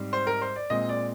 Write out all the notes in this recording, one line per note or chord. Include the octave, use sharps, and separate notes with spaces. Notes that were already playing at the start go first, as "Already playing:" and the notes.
Already playing: G#2 G3 C4
C5
A#4
C5
D5
A#2 G#3 C4 D#5
D5